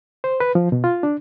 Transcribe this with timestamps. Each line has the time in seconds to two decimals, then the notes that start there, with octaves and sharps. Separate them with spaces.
0.24 C5
0.40 B4
0.55 F3
0.72 B2
0.84 F4
1.03 D4